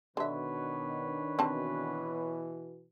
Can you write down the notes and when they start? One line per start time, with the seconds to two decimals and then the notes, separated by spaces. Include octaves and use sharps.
0.17 B2 D3 D#3 D4 B4 C#5 E5
1.39 B2 E3 C4 A5